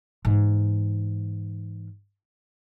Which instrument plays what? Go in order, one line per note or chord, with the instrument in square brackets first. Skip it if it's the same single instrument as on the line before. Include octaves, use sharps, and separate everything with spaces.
[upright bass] G#2 E3